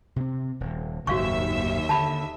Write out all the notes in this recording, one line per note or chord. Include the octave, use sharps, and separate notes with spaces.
C3 C4
D#1
F#1 D#2 G#2 F#4 E5 F5 C#6
D3 A5 B5